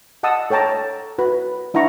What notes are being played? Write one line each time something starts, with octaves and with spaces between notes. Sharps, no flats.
D#5 F#5 A5 D#6 E6
A4 C#5 G5 A5 A#5
F#4 B4
D4 E4 F#5 A#5 C#6